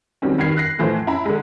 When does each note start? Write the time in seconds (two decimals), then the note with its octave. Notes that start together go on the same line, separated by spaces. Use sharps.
0.22 D#3 F#3 G3 C4 C#4
0.38 G2 D#3 G#6 C7
0.57 F#6 A#6 C7
0.79 A2 E3 F3 A3 C5
1.07 C#4 E4 A#5 B5
1.26 D3 G#3